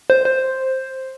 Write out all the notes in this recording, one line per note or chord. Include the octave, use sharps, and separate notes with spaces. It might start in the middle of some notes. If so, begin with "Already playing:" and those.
C5
C5